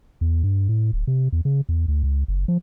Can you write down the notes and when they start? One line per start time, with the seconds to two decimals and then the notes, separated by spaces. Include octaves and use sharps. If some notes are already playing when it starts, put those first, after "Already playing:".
0.21 E2
0.43 G2
0.69 A2
0.93 D1
1.07 C3
1.32 E2
1.45 C#3
1.69 E2
1.88 D2
2.03 C#2
2.28 F#1
2.48 F3